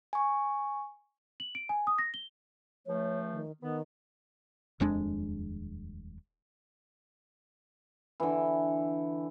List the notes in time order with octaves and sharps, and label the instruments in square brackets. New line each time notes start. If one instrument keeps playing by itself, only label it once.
[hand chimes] G#5 C#6
[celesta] F#7
D7
G#5
D#6
A#6
G7
[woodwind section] C#2 F3 A3 [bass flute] C#5
[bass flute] D#3
[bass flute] D#3 [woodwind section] B3
[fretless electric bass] D#1 F2 G#3 D4
[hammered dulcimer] D3 E3